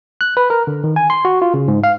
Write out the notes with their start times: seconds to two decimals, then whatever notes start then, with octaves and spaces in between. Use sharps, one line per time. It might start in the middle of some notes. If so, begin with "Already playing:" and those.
0.21 F#6
0.37 B4
0.50 A#4
0.67 D3
0.84 D#3
0.96 G#5
1.10 C6
1.25 F#4
1.42 F4
1.54 C#3
1.68 G#2
1.84 F5